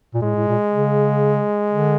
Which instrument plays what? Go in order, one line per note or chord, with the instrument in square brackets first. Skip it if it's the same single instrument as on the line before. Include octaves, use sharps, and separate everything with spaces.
[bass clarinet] A#2
[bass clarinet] A2 [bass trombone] G#3
[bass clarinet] A2
A#2
C#3
D3